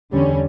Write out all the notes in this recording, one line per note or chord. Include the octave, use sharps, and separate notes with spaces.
E2 D3 G3 C#4